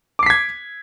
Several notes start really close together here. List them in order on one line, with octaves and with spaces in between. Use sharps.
D6 C7 B6 G#6